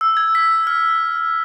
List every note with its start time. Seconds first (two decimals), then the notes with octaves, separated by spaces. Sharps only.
0.01 E6
0.17 G#6
0.35 B6
0.67 F6